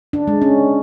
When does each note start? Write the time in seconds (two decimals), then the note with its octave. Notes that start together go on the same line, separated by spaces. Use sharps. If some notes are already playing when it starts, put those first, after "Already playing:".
0.13 D4
0.28 G#3
0.42 C#4